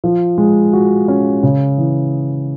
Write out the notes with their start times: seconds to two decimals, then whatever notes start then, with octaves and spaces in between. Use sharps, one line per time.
0.04 F3
0.38 G#3
0.73 F#4
1.08 C#4
1.43 C#3
1.78 E3